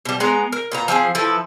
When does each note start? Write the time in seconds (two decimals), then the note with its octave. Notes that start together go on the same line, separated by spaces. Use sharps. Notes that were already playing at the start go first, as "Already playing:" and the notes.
0.05 B2 G3
0.20 G#3 B3 A#5
0.52 A#4
0.72 A#2 B3 A#5
0.88 F3 C4 F#4 G#4
1.15 F3 E4 A4 B4